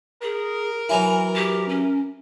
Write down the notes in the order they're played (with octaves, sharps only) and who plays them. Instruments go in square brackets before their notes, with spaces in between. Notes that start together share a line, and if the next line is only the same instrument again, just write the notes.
[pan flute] G#4 [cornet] A#4
[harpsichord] E3 F#3 E4 [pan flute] G#5
[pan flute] G4
C#4